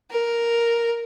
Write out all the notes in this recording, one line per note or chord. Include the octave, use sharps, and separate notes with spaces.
A#4